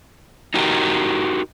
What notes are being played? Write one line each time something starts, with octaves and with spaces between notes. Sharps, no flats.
D#4 F#4 G4 A#4